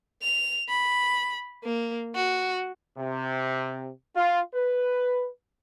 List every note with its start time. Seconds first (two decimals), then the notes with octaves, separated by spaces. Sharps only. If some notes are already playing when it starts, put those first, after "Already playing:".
0.23 F7
0.69 B5
1.64 A#3
2.15 F#4
2.97 C3
4.15 F4
4.54 B4